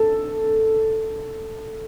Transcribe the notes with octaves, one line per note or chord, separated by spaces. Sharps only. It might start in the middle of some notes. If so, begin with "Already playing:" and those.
Already playing: A4